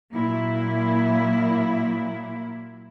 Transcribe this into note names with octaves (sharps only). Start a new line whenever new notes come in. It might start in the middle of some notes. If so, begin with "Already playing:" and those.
A#2 F#3 A#3 E4